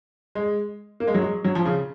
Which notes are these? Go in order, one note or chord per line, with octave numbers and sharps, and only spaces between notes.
G#3
A#3
G#3
F#3
G#3
F#3
F3
C#3